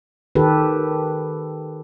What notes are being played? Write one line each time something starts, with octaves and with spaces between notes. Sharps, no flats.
D#3 G4 A4 B4